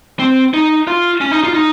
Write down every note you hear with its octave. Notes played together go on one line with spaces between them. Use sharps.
C4
D#4
F4
C#4
D#4
F4
D#4